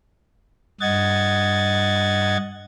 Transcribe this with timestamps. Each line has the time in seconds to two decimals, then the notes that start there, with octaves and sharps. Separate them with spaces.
0.81 G2 D#5 F#5 G#6 A6